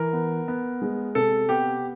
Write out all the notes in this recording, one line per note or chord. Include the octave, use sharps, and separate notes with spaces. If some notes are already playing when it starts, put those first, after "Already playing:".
Already playing: E3 A#4
B3
B3
G#3
C3 A4
B3 G4